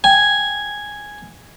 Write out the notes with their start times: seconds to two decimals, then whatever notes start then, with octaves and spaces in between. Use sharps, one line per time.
0.04 G5 G#5